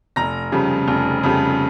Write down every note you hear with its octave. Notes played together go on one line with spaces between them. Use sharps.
F1 A#5 A#6
F2 C#3 G3
F1
F2 C#3 G3